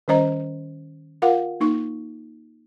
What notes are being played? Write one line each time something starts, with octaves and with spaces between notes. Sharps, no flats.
D#3 G3 C#4 C5 D#5 A#5
F4 A#4 F5 F#5
A#3 D#4 C#6